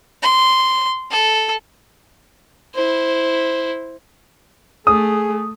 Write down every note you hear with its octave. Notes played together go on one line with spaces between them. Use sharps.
C6
A4
E4 C5
A3 G#4 D#6